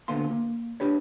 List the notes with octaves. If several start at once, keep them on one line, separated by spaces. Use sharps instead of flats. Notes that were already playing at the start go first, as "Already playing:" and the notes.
D2 A#2 D3 B3 F5 C6
A#3
D4 G4 B4 C#5